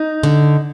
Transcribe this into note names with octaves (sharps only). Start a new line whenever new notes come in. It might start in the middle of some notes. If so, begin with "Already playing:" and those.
Already playing: D#4
D3